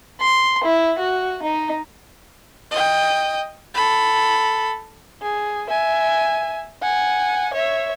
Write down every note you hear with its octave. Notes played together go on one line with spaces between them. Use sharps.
C6
E4
F#4
D#4
D#5 G5
A4 B5
G#4
E5 G#5
F#5 G#5
C#5 E5